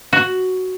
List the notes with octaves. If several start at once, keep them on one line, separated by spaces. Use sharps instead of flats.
F#4